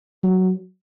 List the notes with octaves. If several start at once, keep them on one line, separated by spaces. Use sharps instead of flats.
F#3